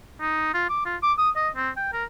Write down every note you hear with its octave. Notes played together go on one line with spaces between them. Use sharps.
D#4
F4
D6
F4
D6
D#6
D#5
C4
G5
A#4